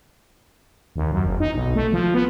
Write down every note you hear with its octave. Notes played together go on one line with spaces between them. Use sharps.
D#2
F#2
F#1
D#4
B1
A3
F3
B3